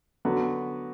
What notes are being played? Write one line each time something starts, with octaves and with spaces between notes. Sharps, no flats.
D3 F#3 B3 F#4